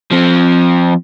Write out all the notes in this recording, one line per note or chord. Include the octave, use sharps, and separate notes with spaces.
F3 C4